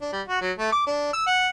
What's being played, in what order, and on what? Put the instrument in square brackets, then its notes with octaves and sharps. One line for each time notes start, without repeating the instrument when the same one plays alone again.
[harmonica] D4
G3
F#4
F#3
A3
D6
D4
E6
F#5